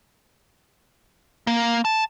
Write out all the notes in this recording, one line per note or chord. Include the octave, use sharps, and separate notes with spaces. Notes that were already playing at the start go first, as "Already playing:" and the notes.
A#3
A5